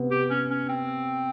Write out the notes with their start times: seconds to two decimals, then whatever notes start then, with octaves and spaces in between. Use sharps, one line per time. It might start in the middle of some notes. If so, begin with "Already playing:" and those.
Already playing: C3 B3
0.11 G4
0.30 C#4
0.51 C#4
0.69 C4